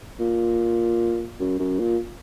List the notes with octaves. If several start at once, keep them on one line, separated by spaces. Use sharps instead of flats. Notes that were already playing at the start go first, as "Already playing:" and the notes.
A#2
F#2
F#2
A#2